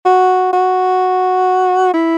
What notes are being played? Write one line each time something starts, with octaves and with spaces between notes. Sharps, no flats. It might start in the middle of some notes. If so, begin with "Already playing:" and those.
F#4
F#4
E4